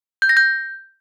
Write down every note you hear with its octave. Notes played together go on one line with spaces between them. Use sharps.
G6
A#6
G6